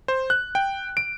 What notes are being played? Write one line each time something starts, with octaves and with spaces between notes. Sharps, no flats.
C5
F#6
G5
D7